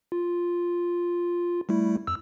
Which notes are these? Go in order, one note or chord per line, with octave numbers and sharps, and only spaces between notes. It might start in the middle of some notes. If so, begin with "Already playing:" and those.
F4
G3 A3 E4
F2 E6